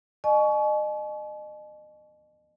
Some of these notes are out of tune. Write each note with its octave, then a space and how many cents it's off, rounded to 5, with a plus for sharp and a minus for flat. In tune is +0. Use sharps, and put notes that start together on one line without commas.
D#5 -35 G#5 +45 C#6 +20